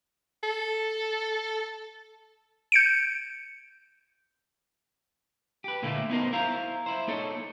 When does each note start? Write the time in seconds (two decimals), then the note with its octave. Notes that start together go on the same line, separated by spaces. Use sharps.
0.43 A4
2.72 G6 C#7 D7
5.64 G4 B4
5.82 A#2 D3 A3 A#3 E4
6.10 B3 D#4 F#4 G#4 A#4 C5
6.33 E4 C5 F5 A#5
6.86 E4 C5
7.08 A#3 D#4 A4 C#5